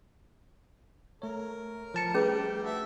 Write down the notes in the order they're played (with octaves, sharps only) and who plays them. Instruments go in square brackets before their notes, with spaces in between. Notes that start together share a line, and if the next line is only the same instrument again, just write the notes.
[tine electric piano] A3 C#5 [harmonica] A#4
[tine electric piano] F3 A5 C#7
[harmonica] G3 G4 [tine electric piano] A3 [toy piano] C#4 G#4 B4
[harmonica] D4 F#4 E5